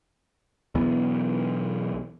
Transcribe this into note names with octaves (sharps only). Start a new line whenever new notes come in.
B1 E3 B3